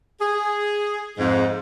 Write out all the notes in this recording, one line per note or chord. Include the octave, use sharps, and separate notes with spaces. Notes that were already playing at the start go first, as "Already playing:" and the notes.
G#4
F2 G#2